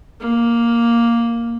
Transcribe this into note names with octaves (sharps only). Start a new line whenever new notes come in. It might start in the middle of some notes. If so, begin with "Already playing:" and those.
A#3